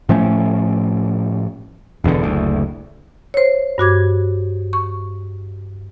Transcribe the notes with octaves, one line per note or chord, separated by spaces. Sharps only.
A2 F3 A3 C#4
E1 E2 B2 D3
F#1 D2
C5 C#5
G2 F#4 D6 G#6
C#6